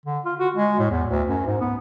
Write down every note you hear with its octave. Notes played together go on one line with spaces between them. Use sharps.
D3
F4
F#4
G#3
A2
E2
D2
F#2
G#2
B3